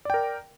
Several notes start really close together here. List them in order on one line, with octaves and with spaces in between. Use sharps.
D5 G5 A#4